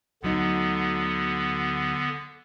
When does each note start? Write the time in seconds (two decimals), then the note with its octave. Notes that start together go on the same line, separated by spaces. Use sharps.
0.23 D2 D3 F#3 B3 D#4